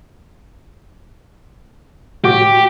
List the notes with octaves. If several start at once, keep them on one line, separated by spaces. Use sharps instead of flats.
A2 F#4 G4 D6